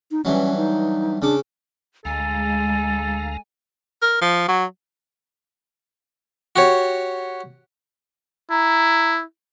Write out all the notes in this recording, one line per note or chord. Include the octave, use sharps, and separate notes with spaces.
D#4
G2 E3 F#3 C#4
D#4
C#3 D4 D6
D2 G#3 A4 F5 G#5 A#5
A#4
F3
F#3
F#4 G4 C#5
E4 A#5